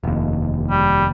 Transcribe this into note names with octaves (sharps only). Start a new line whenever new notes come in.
F1 D#2
G3